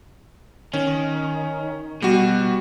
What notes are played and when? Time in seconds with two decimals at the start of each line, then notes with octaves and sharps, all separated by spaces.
0.73 D#3 C#4
2.02 B2 G3 F#4